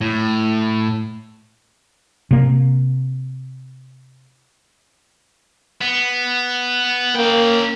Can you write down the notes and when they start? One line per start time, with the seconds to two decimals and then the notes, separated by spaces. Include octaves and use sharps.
0.01 A2
2.31 C3 A#3
5.81 B3
7.15 A#3 C#4 G5